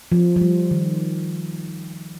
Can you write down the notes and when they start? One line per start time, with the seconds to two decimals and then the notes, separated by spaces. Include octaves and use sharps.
0.12 F3
0.36 F3
0.41 G3
0.71 D#3